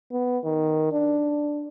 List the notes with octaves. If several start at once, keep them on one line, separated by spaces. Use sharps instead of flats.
B3
D#3
D4